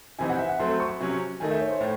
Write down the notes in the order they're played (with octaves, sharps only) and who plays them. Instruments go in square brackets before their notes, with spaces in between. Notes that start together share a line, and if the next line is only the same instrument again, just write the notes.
[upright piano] C3 E3 C4 D#4 [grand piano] G#5
[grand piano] F#5
E5
F#5
[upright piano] F#3 A3 C4 [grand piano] C6
[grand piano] C#6
[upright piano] C3 F#3 C#4
[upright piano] D#3 A3 D#4 [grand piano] G#5
[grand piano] E5
C#5
C5
[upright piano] A2